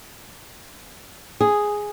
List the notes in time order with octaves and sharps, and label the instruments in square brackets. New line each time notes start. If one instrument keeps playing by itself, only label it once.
[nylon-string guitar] G#4